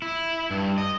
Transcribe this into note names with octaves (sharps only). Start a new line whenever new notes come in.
E4
G2
D#5